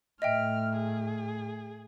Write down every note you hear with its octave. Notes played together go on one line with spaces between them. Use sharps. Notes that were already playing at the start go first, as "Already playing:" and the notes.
A2 D#5 E5 G5 F6
G#4